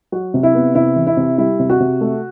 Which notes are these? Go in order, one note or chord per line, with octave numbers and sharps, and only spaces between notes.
F#3 F#4
C3
E4
B3
C3 E4
E3
E4
C3
G3 E4
C3
F#4
C3
A3